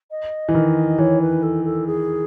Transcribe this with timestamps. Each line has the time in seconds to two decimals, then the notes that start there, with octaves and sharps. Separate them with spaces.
0.11 D#5
0.49 E3
0.54 D#3
0.98 E3 C#5
1.21 B4
1.43 A4
1.65 A4
1.87 G#4